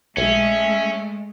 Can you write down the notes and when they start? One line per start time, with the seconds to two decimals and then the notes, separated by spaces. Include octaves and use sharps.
0.17 B1 G#3 A3 C#4 E5